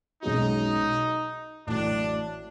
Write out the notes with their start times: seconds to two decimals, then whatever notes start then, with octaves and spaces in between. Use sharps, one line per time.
0.23 B1 B2 G#3 C#4 D#4 F#4
1.67 A1 A2 F#3 D4